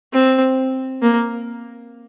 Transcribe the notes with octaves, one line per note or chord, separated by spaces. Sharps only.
C4
A#3